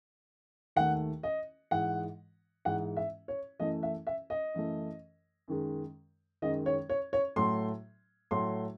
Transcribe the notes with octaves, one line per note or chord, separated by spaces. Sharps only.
D#2 D#3 A3 F#5
D#5
G#2 E3 G#3 F#5
G#2 E3 G#3 F#5
E5
C#5
F#2 E3 A3 D#5
E5
E5
D#5
F#2 E3 A3
F#2 D#3 G#3
F#2 D#3 G#3 D#5
C#5
C#5
C#5
A2 F#3 A3 C6
A2 F#3 A3 C6